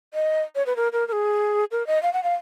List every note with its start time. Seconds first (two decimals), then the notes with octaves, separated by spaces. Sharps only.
0.14 D#5
0.56 C#5
0.66 B4
0.76 A#4
0.93 A#4
1.08 A#4
1.12 G#4
1.71 A#4
1.87 D#5
2.03 F5
2.13 F#5
2.24 F5